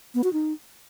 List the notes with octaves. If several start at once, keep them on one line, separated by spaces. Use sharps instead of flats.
B3
F#4
D#4